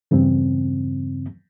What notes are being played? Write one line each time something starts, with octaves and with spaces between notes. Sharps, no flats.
E2 G2 C#3 C4